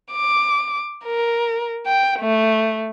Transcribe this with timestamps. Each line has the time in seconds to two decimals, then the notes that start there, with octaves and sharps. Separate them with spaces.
0.11 D6
1.03 A#4
1.85 G5
2.19 A3